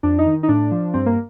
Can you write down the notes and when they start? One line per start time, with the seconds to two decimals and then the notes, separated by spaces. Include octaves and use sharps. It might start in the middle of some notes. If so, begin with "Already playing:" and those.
0.03 F2 D4
0.18 D#4
0.26 D#3
0.43 D#4
0.48 A2 D4
0.71 F3
0.94 G2 C4
1.06 A#3